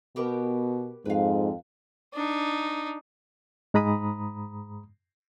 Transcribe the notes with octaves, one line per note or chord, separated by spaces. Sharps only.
B2 B3 G4 A#4
F2 G#2 B4 F5
D4 D#4
G#2 G#3 A#5 B5 D#6